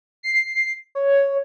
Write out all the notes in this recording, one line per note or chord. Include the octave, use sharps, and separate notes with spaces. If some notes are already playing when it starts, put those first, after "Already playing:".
C7
C#5